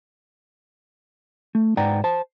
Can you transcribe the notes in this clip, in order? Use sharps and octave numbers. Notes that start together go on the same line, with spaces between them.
A3
G#2 B4 D5 F#5 G5 A#5
C5 A5